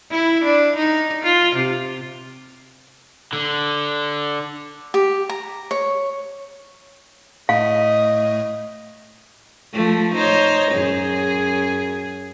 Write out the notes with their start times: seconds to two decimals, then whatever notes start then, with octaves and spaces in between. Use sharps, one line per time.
0.11 E4
0.44 D4
0.76 D#4
1.23 F4
1.55 C3
3.33 D3
4.94 G4
5.29 A#5
5.71 C#5
7.49 A2 A3 D#5 F5
9.73 F3 A3
10.15 D#4 C5 C#5
10.72 F#2 G#4